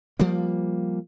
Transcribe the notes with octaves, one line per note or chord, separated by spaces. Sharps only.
F3 G3 A#3